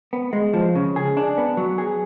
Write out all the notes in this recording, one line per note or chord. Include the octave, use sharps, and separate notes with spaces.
B3
G#3
F3
C#3
G#4
D4
B3
F#3
G#4